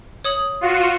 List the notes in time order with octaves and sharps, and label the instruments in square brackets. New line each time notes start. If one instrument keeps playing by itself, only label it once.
[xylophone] C#5 D#6 F#7
[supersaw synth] F4 F#4